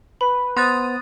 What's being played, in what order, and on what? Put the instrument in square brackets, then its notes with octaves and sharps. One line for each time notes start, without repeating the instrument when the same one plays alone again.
[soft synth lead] B4 [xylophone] B5
[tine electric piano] B3 C5 [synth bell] C6 F#6 A6 [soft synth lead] D#6